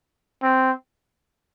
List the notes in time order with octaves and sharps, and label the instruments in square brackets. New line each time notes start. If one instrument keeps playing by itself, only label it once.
[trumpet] C4